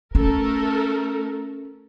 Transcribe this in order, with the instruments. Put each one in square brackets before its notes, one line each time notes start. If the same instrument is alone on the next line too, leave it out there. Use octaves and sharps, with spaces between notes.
[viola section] A3 A4 A#4 [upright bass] C#4